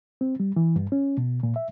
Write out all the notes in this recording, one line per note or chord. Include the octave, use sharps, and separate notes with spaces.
C4
G3
E3
G2
C#4
B2
A#2
E5